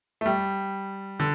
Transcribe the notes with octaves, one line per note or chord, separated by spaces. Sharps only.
A3
G3
D3